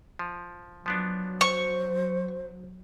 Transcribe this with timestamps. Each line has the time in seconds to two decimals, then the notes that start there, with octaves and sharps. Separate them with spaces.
0.19 F3
0.86 F3 F#3 B3 D4
1.41 C5 C#6